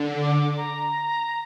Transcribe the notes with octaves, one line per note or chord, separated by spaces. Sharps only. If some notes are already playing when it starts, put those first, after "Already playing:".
Already playing: D3
D6
A#5